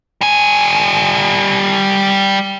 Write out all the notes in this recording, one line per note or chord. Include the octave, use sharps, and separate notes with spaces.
G3 G#5